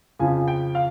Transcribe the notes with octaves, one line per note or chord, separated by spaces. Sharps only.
F2 C#3 F3 G#5
G5
F5